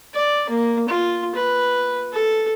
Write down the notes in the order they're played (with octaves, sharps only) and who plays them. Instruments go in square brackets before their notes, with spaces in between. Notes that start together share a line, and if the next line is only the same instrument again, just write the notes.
[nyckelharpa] D5
A#3
F4
B4
A4